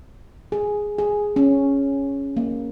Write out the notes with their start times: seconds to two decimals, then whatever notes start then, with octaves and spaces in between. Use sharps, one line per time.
0.52 G#4
0.98 G#4
1.36 C#4
2.37 A#3